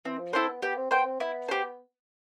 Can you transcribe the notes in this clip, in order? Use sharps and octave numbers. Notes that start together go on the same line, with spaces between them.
E3 C4
F3
C4 E4 A4 C5
B3
B3 G4
C4
B3 C5 G5
C4
B3 E4
G4 C5